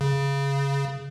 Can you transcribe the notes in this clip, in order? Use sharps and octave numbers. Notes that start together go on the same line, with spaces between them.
C#3